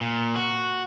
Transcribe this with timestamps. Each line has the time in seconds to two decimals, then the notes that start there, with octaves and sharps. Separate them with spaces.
0.01 A#2
0.36 F#4